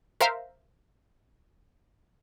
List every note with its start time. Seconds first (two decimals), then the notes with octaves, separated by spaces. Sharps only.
0.21 A#4 C5 E5 F5